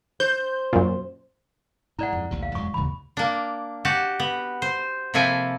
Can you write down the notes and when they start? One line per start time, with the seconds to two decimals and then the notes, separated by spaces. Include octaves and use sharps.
0.20 C5 G6
0.73 F#2 A#2
1.99 G#2 E4 D5 F#5
2.13 F2
2.31 A#1 D#2 C3 A3
2.43 F5
2.55 E1 F2 G#2 F#3 C#6
2.74 D#1 D#2 G#2 C#3 E3 B5
3.17 A#3 D4
3.85 F#4 G4 A5
4.20 B3
4.62 C5
5.14 C3 F3 A#3 E4 A4 G#5